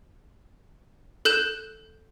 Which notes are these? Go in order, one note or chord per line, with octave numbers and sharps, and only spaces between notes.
A4 F#6 G6 E7